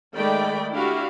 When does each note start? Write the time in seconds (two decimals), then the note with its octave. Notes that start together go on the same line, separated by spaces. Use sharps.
0.16 D#3 G#3 A3 D5 G5 B5
0.73 D4 E4 F#4 G4 F5